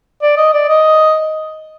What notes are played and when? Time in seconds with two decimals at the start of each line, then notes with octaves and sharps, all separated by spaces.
0.22 D5
0.37 D#5
0.53 D5
0.68 D#5